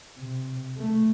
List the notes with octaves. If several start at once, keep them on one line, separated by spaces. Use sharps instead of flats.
C3
A3